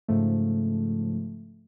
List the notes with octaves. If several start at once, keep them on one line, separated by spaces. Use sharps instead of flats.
G#2 C#3 F3 A3